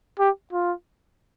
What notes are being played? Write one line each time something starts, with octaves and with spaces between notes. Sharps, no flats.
G4
F4